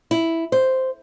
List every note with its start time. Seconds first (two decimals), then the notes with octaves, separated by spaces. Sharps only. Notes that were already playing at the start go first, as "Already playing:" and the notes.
0.11 E4
0.52 C5